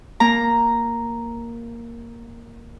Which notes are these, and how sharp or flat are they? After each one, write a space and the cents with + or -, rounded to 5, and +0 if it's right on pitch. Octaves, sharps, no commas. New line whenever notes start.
A#3 +0 A#5 +0